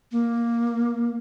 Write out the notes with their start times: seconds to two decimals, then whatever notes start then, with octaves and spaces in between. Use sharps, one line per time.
0.11 A#3